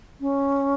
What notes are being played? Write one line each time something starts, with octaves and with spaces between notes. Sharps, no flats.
C#4